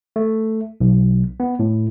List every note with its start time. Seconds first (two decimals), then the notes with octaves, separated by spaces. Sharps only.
0.16 A3
0.81 B1
1.40 B3
1.59 A2